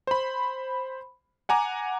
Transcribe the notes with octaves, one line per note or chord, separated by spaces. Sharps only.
C5 B5
F#5 G#5 A#5 D6